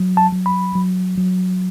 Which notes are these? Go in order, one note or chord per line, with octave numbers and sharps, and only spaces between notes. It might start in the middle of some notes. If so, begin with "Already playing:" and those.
Already playing: F#3
A5
F#3
B5
F#3
F#3